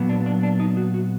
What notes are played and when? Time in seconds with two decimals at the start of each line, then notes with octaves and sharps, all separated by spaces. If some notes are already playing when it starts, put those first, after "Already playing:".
Already playing: A#2 F#3 B3
0.09 D4
0.26 D4
0.43 D4
0.60 D#4
0.77 F#4
0.94 F#4